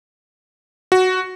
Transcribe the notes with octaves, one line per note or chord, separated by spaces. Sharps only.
F#4